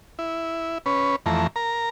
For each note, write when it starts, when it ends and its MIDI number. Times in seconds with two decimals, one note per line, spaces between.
0.19 0.78 64
0.86 1.16 61
0.86 1.16 71
1.26 1.47 41
1.26 1.47 52
1.26 1.47 57
1.26 1.47 82
1.56 1.89 70
1.56 1.89 82